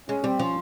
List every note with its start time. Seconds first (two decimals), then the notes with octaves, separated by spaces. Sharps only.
0.09 G#3 C#4
0.24 G3 C4
0.39 F3 C#4